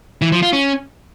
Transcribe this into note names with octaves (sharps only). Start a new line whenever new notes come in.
E3
F3
F4
C#4